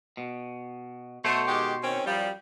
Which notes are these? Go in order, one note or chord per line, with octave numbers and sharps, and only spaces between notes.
B2
B2 A3 C5 C#5
D#3 G#3 G4
D#3 C4 C#4
F#2 F3 G3